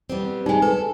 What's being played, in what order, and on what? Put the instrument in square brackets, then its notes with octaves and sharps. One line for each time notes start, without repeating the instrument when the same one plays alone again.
[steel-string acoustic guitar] G3 B3 C4
[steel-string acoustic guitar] G3 G#3 [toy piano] D#4 G#5
[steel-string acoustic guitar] A4 [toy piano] B4